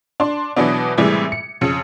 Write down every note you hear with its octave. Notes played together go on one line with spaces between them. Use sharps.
D4 C6
B2 E3 F#3 B3 D4
A2 C3 E3 G3 G#3
C#7
F2 C#3 C#7